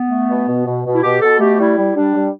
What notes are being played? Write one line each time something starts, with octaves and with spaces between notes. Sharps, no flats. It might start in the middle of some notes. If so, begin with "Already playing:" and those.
Already playing: B3
A3
B2
B2
B2
B2
E4
B2 G4
B2 A4
A3 G4
G3 E4
G3
G3 D4
G3